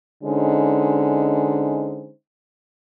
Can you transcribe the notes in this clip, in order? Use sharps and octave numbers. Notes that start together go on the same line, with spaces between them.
D3 G#3 C#4 D#4 C5